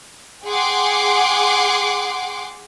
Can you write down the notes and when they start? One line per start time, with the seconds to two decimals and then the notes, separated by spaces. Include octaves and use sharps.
0.45 G#4 F#5 G5 C6 D6